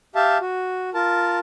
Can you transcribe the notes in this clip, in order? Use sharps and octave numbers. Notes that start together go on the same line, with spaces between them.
G4 E5 F5 A5
F#4
F4 A#4 A5